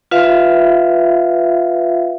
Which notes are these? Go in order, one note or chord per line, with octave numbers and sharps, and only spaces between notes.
F4 B4 E5 F5